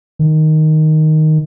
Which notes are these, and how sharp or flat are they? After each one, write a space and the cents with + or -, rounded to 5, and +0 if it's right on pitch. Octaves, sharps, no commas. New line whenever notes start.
D#3 +0